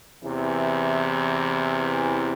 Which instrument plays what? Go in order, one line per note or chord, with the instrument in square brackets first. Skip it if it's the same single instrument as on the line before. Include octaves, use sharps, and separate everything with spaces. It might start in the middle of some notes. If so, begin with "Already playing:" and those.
[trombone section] E2 C3 E3